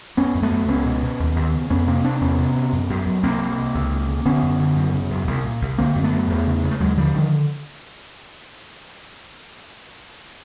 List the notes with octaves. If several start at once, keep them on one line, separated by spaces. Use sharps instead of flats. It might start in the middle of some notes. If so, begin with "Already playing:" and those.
F#2 B3 C#4
F#2
A3 B3
F#2
C#2 B3 C#4
B2
B2
D#2
D#2
C#3
F2 B3 C#4
C3 A#3 C4
C3 C4 D4
E2 B3 C#4
C3
C3
F#2
F#2
F#2
C2 A#3 C4
C3
C3
C#2
C#3
C#3
D3 B3 C#4
F#2
D3
F#2
C#3
F#2
C2
A#2
C2
D3 A#3 C4
F#2
A3 B3
F#2
E2
C#3
C#3
A3
D#2 F#3 G#3
D3 F3 G3
D3 D#3 F3